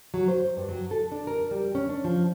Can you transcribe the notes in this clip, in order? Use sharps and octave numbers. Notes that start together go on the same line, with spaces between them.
F#3
C5
G2
F#3
A4
D4
A#4
G3
C#4
D4
F3